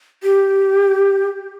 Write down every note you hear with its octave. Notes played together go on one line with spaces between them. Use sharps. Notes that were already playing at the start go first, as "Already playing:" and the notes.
G4